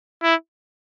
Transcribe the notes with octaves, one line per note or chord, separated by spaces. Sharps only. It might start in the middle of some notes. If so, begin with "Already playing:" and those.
E4